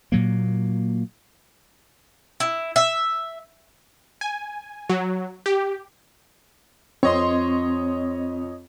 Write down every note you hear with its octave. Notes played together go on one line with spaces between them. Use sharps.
A#2 F#3 A#3
E4
E5
G#5
F#3
G4
F2 C4 C#5 D#5 C6